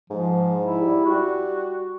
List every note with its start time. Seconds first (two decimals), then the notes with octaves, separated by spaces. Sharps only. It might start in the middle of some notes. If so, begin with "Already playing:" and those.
0.10 G#2 F3
0.63 E4
0.81 G3
1.05 G3 F#4